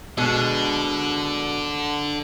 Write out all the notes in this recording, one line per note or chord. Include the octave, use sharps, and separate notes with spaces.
B2 D3 G#3 D4